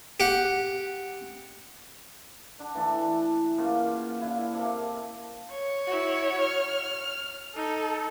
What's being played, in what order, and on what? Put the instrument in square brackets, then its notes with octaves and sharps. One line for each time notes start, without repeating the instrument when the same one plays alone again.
[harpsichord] G4 F#5
[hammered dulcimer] D3 D4
E3 A3 D4 A4
C#3 A#3 F4 F#4
D3 E4 F5
C3 A#3 A4
[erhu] C#5
[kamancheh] E4 F#4
F6
[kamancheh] D#4 [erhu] A4